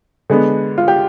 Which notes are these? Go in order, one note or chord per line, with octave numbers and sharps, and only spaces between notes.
D3 G#3 B3
F4
G4